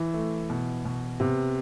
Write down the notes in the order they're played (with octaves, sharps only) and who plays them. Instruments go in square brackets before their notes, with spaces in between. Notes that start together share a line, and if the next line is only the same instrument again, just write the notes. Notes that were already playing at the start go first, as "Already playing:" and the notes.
Already playing: [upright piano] E3
[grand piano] A3
B2
B2
[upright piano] C3 [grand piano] B3